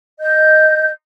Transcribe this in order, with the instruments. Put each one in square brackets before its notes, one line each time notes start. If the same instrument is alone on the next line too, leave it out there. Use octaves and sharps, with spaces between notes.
[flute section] D#5 G6